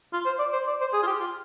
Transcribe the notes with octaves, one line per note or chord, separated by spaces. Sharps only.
F4
C5
D5
C5
D5
C5
G#4
F4
G4
F4